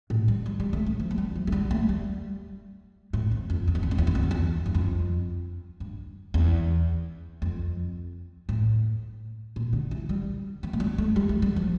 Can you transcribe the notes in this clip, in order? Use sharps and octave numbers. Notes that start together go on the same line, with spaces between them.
A2
G3
G3
G3
A3
A3
F3
A3
G3
F3
A3
G3
A3
G3
A2
F2
F2
E2
F2
E2
F2
E2
F2
E2
F2
E2
G2
F2
G2
E2
F2
A2
A#2
D3
E3
G3
E3
A3
G3
A3
G3
A3
G3
F3